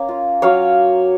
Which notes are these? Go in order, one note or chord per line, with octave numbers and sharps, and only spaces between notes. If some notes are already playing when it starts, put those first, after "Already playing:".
Already playing: A#3 C#4
F4
F#3 C#5 F5